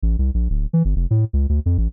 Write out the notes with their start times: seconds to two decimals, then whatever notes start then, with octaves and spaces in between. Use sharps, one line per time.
0.03 A1
0.19 C2
0.34 A#1
0.50 D1
0.73 E3
0.85 G1
0.96 F1
1.11 A2
1.33 C#2
1.49 D2
1.66 F2
1.78 A1